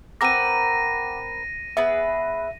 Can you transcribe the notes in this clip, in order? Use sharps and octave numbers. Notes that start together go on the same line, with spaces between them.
C4 A#4 B4 F#5 D6 A#6 D#7
B3 G#4 B4 E5